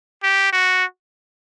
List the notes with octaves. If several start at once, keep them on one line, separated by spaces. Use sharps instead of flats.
G4
F#4